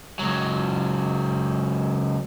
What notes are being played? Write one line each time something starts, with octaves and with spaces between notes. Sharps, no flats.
C#2 F#3